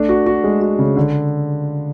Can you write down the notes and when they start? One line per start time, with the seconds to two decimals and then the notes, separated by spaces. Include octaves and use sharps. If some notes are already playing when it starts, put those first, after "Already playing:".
Already playing: A3 D4
0.09 F#4
0.26 F#4
0.44 G#3
0.61 F#4
0.79 C#3
0.96 D3